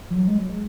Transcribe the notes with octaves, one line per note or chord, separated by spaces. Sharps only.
F3
F#3
G#3
F#3
G#3